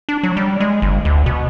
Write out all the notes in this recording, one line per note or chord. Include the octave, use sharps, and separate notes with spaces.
D4
F#3
G3
G#3
G1
D2
B2